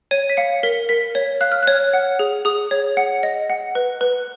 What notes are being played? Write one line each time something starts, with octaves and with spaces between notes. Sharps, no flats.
C#5 D#7
B6
F5 C#7
A#4 B6
A#4 B6
C#5 G#6
F5 F#6
F6
C#5 F#6
F#5
G#4
G#4 D#6
C#5
F#5
D#5
F#5
B4
B4